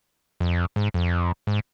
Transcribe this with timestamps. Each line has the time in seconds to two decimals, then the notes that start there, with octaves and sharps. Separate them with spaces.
0.40 F2
0.76 G#2
0.94 F2
1.47 G#2